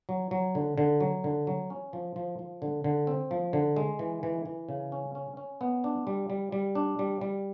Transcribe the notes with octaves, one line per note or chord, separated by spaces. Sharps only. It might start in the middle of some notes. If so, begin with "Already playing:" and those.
F#3
F#3
D3
D3
F#3
D3
F#3
C#4
F3
F3
F3
D3
D3
C4
F3
D3
G#3
E3
E3
E3
C#3
C#4
C#4
C#4
B3
D4
G3
G3
G3
D4
G3
G3